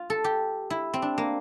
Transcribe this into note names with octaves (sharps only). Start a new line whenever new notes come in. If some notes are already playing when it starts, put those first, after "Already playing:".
Already playing: F4
A4
G4
E4
C4
D4
A#3